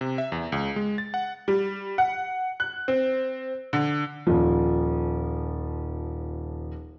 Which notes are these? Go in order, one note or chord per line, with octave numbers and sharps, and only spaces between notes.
C3
E5
E2
C#2
G#3
A6
F#5
G3
F#5
F#6
C4
D3
D#1 F3